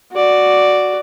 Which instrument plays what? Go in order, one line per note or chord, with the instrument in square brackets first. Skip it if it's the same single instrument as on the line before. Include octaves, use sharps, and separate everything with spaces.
[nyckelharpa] F#4 D5